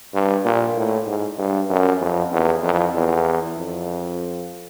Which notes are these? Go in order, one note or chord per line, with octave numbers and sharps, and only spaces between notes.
G2
A#2
A2
G#2
G2
F#2
F2
E2
F2
E2
F2